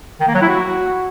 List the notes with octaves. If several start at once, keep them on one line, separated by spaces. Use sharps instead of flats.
D#3
A#3
F#3
E4
F#4